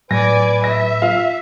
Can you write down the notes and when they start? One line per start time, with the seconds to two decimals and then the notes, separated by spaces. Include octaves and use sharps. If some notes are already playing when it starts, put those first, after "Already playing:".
0.11 A2 F#3 B4 D5 G#5 A#6
0.64 E5 A#6
1.02 F4 F5